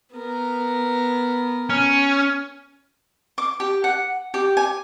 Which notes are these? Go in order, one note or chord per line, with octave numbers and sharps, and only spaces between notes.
B3 A#4
C#4
D6
G4
F#5
G4
G#5